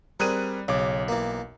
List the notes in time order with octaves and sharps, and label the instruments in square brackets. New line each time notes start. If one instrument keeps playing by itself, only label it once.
[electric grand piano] G3 F#6 D#7 [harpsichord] C4 G#4 A#4
[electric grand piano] B1 D6 [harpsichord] C#3
[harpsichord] E3 A#3